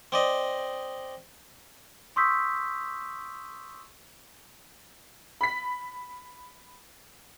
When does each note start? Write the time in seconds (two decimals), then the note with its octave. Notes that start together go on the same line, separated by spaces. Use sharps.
0.12 C4 D5 D#5
2.16 C6 C#6 D#6 E6 G6 B6
5.41 B5 B6